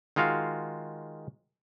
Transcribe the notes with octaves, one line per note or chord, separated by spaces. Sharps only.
D#3 G#3 F4 F#4 F5